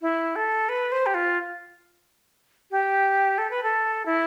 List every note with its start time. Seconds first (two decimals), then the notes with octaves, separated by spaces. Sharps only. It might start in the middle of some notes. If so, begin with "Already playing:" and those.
0.02 E4
0.36 A4
0.69 B4
0.92 C5
1.06 G4
1.14 F4
2.71 G4
3.38 A4
3.50 B4
3.63 A4
4.05 E4